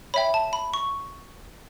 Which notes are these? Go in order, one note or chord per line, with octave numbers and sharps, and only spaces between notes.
C#5 E5 G5 B5
A5
B5
C#6